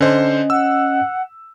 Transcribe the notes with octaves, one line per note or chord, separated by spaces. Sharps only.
D3 C#4 C5 D#5
F#5 E6